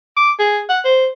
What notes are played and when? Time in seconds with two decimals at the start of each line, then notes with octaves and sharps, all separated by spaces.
0.17 D6
0.39 G#4
0.70 F#5
0.85 C5